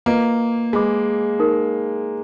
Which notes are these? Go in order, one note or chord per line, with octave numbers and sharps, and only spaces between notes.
A#3 F4 B4 D#5 A#5 D6
G#3 B4 D#5 G#5 B5 D6
D#4 A#4